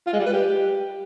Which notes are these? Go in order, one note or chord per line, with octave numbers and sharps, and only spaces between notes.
F4
G#3
G3
B4
G4